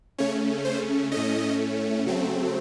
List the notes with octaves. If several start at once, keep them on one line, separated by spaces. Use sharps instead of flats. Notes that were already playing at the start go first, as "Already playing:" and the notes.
C#3 A3 C#4 C#5
C5
A2 A3 C#4 D#5
C#3 F#3 A3 C4